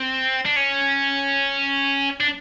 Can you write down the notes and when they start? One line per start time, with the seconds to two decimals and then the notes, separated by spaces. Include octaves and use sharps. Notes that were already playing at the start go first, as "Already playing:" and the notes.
Already playing: C4
0.46 D4
0.56 C#4
2.20 D4